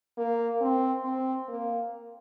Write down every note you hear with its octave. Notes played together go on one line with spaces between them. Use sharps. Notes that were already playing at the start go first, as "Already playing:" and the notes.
A#3
C4
C4
A#3